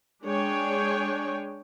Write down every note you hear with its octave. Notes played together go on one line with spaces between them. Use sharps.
G#3 D4 G#4 C#5 G5 G#5